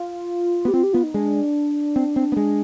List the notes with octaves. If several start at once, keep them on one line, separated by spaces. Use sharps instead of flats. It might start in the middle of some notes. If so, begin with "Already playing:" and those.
Already playing: F4
B3
G4
C4 F4
G4
B3 F4
D#4
G#3 D4
C4
C4
B3
G#3